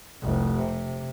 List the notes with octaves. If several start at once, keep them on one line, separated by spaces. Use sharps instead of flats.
F1 C2
C3